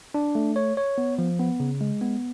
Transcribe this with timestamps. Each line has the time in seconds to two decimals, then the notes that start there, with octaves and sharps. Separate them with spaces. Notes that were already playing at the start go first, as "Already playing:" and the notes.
0.14 D4
0.35 A3
0.56 C#5
0.77 C#5
0.98 B3
1.19 F3
1.39 B3
1.60 C#3
1.81 G#3
2.01 B3